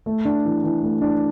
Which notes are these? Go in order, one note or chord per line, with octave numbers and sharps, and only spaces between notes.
A3
D4
E3
E3
A3
D4